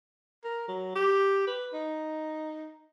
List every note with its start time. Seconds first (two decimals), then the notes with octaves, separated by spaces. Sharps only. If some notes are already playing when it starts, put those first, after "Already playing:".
0.44 A#4
0.68 F#3
0.95 G4
1.47 B4
1.73 D#4